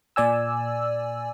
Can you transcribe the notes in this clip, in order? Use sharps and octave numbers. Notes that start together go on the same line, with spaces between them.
A#2 D5 G#5 E6